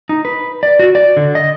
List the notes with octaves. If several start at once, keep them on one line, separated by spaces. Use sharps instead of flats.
D#4
B4
D5
F#4
D5
D3
D#5